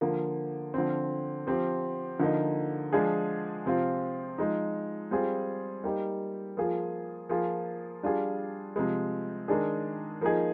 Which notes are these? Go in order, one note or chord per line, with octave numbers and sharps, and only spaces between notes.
D3 F3 A#3
D3 F3 C4
F3 C4 G4
D3 F3 A#3 D#4
F3 G#3 D4 F4 G#4
C3 F3 C4 F4
F3 G#3 D#4
G3 C4 F4 G#4
G3 A#3 D#4 G4
F3 A#3 F4 G#4
F3 A#3 F4 G#4
G3 D4 F4 G#4
C3 F3 G#3
D#3 G#3 D4 G#4
F3 A#3 D#4 G#4